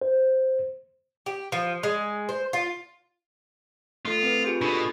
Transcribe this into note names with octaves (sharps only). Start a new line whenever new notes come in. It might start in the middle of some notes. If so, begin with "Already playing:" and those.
C5
G4
F3
G#3
C5
F4
A3 F4 A4
C4 B4
F4 G4 G#4
B2 D4 A4 B5